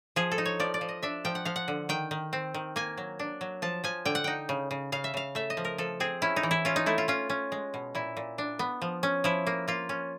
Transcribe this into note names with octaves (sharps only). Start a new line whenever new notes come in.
F3 G#4
A4
D#4
C#5
F3 D5
D5
F3
D#5
D4 E5
F3 G5
F#5
F3 F5
F#5
D3
D#3 G5
D#3
C4
D#3
A#3 G#5
F#3
D4
F#3
F3 A5
F3 G#5
D3 G5
F#5
D#4 G5
C#3
C#3
C#3 F5
E5
C#3 F5
A3 E5
D#5
F3
A#4
F3 A4
C4 G#4
C#4 E4
D#4
E3
E4
C#4 F4
D#4
A3 E4
F4
C#4 F4
C#4
G#3
B2
A#2 E4
A#2
D4
B3
F3
C#4
F3 E4
A#3
A#3 F4
C#4